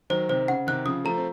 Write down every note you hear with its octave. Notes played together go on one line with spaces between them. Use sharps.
D#3 F#3 C5
C3 D#3 C5
C#3 F#5
C3 D#3 F#6
C#3 F3 D#6
F3 A3 A#5
C4